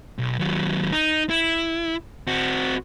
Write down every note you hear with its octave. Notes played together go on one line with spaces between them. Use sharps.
B1
D#2 F#3
D#4
E4
C4 F#4